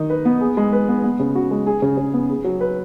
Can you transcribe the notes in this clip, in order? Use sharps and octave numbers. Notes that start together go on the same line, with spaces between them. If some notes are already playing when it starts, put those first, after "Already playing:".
Already playing: D#3 D#4
B4
B3
G#4
G#3
B4
B3
B3
C#3
F#4
G#3
G#4
C#3
C#3
B3
G#4
F#3
B4